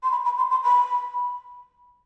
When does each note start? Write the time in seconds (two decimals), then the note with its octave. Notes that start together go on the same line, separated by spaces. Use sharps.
0.03 C6
0.11 B5
0.25 B5
0.37 C6
0.51 C6
0.64 B5